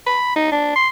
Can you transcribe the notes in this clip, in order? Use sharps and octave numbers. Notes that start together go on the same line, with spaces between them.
B5
D#4
D4
C6